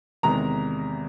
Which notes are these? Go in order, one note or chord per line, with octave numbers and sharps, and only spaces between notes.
E2 C3 D#3 G#3 A#5